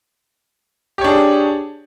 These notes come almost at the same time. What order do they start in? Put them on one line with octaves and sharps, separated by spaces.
G4 C#5 D4 G#4